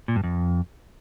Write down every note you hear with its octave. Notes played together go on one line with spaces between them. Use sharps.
A#2
G2
F2